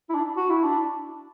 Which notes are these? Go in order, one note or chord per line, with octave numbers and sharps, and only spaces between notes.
E4
D4
F#4
E4
D4